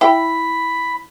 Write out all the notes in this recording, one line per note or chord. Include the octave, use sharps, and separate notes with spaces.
E4 G5 B5